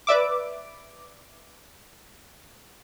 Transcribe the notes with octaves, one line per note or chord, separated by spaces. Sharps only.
B4 D5 E5 D6